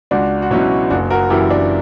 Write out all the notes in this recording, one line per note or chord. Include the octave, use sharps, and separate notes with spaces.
C#2 D4 F#4
F#4
B2 F#3 C#4 E4
F#1 D4 F#4
F#4 A#4
F#2 E3 E4 G4
D4